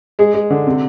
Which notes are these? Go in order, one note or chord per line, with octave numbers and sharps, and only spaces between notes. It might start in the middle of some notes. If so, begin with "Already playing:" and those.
G#3 G#4
G#3
D3
C3